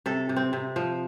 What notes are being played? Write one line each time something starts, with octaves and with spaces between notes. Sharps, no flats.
C3 A4
C3
C4
C3
F3